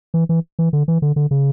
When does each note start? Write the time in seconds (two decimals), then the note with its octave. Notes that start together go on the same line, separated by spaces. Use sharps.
0.14 E3
0.29 E3
0.59 E3
0.73 D3
0.88 E3
1.02 D3
1.16 D3
1.31 C#3